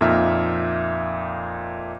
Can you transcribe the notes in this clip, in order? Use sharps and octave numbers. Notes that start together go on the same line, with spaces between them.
F2 A#2 D#4 E5 F6